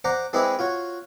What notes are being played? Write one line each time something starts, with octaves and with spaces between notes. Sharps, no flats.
C5 D5 F#5 A#5
G#3 C4 E4 G#4 B4 D5
F4 F#4 C#5